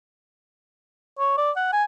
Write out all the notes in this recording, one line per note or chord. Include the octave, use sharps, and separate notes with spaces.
C#5
D5
F#5
G#5